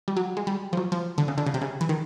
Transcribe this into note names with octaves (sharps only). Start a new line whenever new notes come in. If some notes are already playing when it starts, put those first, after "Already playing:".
G3
F#3
G#3
G3
F3
F#3
F3
D3
C#3
D3
C#3
C3
C#3
E3
D#3